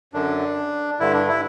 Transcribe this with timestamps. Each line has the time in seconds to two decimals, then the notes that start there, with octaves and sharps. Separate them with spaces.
0.13 F#2 D3 D4
1.00 G2 D3 E4
1.14 D4
1.28 E4